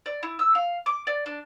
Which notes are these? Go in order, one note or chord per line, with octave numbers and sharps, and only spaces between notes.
D5
E4
E6
F5
D6
D5
D4